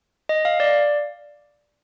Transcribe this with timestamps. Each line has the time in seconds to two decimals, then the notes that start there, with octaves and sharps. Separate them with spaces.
0.29 D#5
0.45 F5
0.60 D5